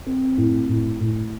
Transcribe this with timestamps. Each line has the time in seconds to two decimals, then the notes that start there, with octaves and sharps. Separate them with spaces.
0.06 C4
0.37 A2
0.69 A2
1.00 A2